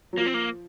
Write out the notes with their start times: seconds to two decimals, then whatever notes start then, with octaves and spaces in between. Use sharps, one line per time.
0.13 F#3
0.17 F3 A#3
0.26 C4
0.34 A#3